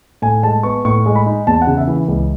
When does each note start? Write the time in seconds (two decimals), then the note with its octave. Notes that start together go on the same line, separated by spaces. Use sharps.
0.22 A2 G#5
0.43 G#3 A5
0.63 B3 C#6
0.85 A2 C#6
1.06 G#3
1.15 B5
1.26 D#4
1.47 E2 A5
1.62 F#5
1.67 C#3
1.78 E5
1.88 E3
2.08 C#2